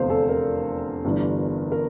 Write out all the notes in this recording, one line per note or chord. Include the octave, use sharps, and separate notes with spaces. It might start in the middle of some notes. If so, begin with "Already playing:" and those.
Already playing: F1 E2 D3 C5 F5
A4
A#4
G1 G2 E3
A#4